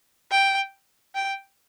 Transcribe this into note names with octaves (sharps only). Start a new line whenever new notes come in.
G5
G5